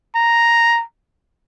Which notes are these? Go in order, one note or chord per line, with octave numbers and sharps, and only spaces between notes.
A#5